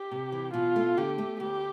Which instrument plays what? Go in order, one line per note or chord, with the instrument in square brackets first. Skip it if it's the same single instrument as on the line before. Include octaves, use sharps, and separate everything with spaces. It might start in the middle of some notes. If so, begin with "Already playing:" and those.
Already playing: [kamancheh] G4
[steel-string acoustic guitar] C3
E3
[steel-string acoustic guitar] B2 [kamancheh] F4
[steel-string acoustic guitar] A3
[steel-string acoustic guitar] D3 [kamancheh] G4
[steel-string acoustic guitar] A3
[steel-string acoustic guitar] D2 [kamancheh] G4